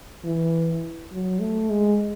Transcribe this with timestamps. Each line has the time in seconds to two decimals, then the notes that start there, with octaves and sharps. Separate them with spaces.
0.25 E3
1.12 F#3
1.41 A3
1.70 G#3